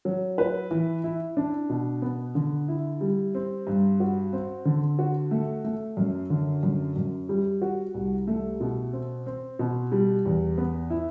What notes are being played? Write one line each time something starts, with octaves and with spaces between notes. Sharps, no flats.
F#3
B4
E3
E4
D4
B2
B3
D3
E4
G3
C4
G2
F#4
C4
D3
F#4
A3
A3
F#2
D3
F#2
F#2
G3
F#4
C2
A3
B2
C4
C4
B2
G3
E2
B3
E4